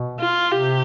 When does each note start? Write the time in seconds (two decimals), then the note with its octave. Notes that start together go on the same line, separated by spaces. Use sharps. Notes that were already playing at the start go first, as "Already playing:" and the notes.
Already playing: B2
0.20 F4
0.52 C3 G4